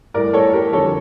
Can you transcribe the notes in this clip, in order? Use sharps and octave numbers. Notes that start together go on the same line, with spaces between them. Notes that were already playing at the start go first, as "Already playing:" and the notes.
A2 G3 A#4 D5
A4 C#5
G4 A#4
F2 D3 G3 A4 C#5